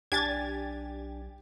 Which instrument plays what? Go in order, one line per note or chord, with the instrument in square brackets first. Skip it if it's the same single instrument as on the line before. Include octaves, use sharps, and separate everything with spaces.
[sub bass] B1 [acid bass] D4 [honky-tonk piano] G4 G#5 [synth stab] G#6 A6